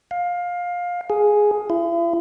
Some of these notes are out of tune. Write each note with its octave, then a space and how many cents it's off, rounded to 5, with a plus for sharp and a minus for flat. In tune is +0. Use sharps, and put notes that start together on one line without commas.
F5 +20
G#4 +5
E4 +45